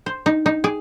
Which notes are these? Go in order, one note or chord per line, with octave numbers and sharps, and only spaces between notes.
C5
D#4
D#4
G#4